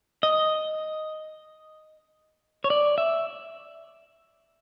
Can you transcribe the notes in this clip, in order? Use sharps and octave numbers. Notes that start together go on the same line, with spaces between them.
D#5
C#5
D5
E5